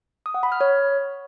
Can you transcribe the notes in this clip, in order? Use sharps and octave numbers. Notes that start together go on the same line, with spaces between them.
D#6
F#5
B5
F6
C#5